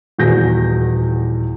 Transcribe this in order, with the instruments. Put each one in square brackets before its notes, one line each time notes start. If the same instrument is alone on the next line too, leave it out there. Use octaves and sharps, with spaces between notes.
[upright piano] D#1 E2 F#4 G#4 G6 A#6